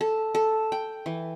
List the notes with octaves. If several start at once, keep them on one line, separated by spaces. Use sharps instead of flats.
A4
A4
G5
E3